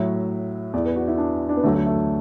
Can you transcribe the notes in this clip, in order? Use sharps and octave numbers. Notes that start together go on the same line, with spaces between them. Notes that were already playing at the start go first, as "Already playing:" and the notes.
Already playing: A2 F#3 E5
E2 E3 D5
B4
F#4
E4
D4
D4
B3
D2 D3 F#3 A3
F#3
A3